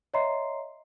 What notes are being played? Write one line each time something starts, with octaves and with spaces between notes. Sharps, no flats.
C#5 D#5 E5 A#5 C6 C7